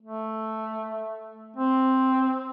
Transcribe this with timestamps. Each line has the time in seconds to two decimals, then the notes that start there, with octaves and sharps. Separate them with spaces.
0.03 A3
1.56 C4